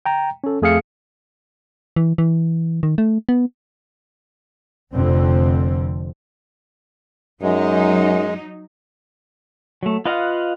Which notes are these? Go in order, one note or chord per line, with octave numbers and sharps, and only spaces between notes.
G5 A#5
C#4 A4
F2 A3 G#4 E5 F5 C#7
E3
E3
D#3
A3
B3
F1 F2 D3 C4
F#2 F#3 G#3 D#4
F#3 A3
F4 B4 D#5 F5 F#5